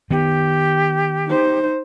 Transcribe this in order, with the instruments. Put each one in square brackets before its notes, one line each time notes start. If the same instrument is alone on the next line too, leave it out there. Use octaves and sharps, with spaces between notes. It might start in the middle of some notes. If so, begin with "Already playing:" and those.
[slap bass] D#3 B3 [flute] G4
[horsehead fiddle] D#4 C5